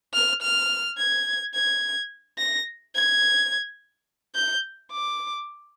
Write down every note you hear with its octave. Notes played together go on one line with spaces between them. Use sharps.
F6
F6
G#6
G#6
A#6
G#6
G6
D6